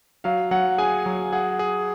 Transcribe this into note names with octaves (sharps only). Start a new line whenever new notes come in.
F#3 F5
F#3 F#5
G#4 G#5
F#3
G#4 F#5
G#4